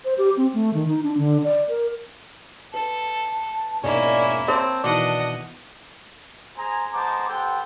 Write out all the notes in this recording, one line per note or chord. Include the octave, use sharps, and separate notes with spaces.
C5
G4
C4
A3
D#3
D#4
D4
D3
D5
A#4
A4 B4 A5
E1 G#2 A#3 C#4 E4 D5 D#5
C4 C#5 A5
B2 D#3 E3 D4 D#5 F#5
G#4 C5 G#5 A#5
G#3 B3 C5 A5 A#5 D6
B3 G4 A4 C5 G5